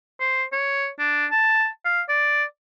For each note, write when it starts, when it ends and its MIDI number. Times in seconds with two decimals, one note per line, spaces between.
0.20 0.44 72
0.52 0.89 73
0.99 1.26 62
1.31 1.68 81
1.85 2.02 77
2.09 2.44 74